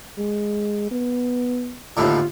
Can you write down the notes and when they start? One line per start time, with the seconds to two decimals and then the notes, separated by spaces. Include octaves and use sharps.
0.18 G#3
0.91 B3
1.97 D#2 A2 D3 F4